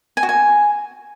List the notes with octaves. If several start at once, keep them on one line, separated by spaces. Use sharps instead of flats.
G#5
F#4
G#5